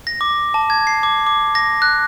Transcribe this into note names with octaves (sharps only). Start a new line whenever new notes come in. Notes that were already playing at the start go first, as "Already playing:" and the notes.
A#6
D6
A5
G#6
C7
D6
D6
A#6
F#6